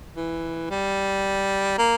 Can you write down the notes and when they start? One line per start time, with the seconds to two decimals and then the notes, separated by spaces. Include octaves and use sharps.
0.16 E3
0.70 G3
1.78 A#3